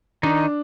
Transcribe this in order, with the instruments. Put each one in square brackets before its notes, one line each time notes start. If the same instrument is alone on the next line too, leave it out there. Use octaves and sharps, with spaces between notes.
[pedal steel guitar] D#3 D#4 [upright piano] D4